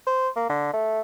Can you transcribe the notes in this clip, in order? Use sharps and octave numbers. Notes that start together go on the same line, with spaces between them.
C5
A#3
D3
A3